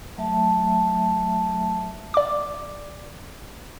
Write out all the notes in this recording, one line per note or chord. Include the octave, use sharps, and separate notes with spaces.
F#3 A3 E5 A5
D5 D6